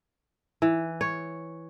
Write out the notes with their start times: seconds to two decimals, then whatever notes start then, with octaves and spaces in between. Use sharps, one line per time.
0.62 E3
1.01 C#5